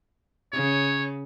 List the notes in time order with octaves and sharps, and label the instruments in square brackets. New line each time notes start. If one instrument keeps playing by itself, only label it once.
[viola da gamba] C#3 [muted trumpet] C#5